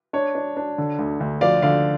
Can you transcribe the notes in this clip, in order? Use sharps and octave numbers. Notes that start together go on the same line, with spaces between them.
D4 C#5
D4
D4
D3
D2
D2
F3 D5 F5
D3 D5 F5